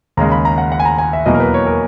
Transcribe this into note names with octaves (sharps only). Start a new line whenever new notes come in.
D#2 C#3 G#3 A#5
B5
A#5
F#5
F#5
G#5
A#5
G#5
E5
E2 B2 F#3 A#3 D#5
A#4
B4
C#5
A#4